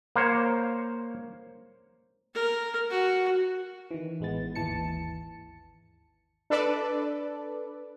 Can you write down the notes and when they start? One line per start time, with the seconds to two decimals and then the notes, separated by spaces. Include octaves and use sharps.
0.16 A#3 C5 C#5
2.35 A#4
2.90 F#4
3.91 D#3 E3
4.20 A1 G#3 B3 A6
4.55 G#1 D#2 E3 A5 C#7
6.50 D4 A4 B4 D5